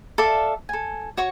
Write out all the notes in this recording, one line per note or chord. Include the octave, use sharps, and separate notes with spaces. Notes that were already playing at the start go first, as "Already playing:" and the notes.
A4 D5 E5 F5
A4 G#5
F#4 C#5 C#6